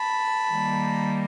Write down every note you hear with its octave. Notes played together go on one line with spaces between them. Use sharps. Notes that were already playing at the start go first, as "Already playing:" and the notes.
Already playing: A5 B5
D#3 G3 A#3